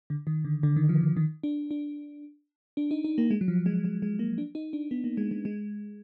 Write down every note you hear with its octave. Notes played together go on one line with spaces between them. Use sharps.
D3
D#3
D3
D3
D#3
F3
F3
D#3
D4
D4
D4
D#4
D#4
A#3
G#3
F#3
F3
G#3
G#3
G#3
A#3
D4
D#4
D4
B3
A#3
G#3
G#3
G#3